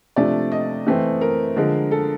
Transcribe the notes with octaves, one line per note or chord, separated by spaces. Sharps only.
C3 F3 A3 D4 D5
D#5
E3 A3 C4
A#4
D3 F3 G#3
A4